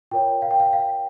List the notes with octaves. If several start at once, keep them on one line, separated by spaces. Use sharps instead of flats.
F4 A#4 C#5 G5
F5
G5
F5
F5